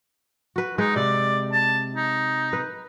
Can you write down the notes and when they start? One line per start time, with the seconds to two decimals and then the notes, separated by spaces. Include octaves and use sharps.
0.56 F#4 B4
0.78 G#3 D#4 B4
0.96 C3 D5
1.52 A5
1.96 D#4
2.53 B4